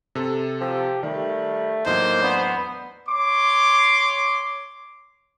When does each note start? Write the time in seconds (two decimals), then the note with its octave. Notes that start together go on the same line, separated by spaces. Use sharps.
0.15 C3 A4
0.60 F3 G4
1.03 D#3 G3 A3
1.86 E2 A2 F#3 A#3 D#4 C5
2.22 B3 D4
3.09 C#5 C6 D6